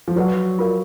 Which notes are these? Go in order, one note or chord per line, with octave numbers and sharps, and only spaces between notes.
F3
F#3 B4 D5 F#5
F4 A#4 D5 F5